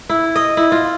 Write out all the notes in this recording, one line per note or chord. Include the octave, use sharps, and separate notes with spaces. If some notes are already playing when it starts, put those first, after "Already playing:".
E4
D#5
E4
F4